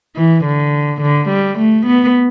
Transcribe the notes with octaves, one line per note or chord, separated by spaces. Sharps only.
E3
D3
D3
G3
A3
B3